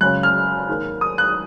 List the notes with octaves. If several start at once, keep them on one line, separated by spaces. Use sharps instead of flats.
F#2 C#3 G#3 C#4 F#6
F6
G#2 D#3 A#3
D#6
F#6